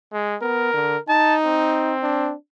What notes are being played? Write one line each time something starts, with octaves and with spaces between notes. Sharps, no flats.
G#3
B3 A#4
D3
D#4 A5
C4
D4